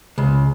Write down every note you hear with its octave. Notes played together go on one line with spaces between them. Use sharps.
C#2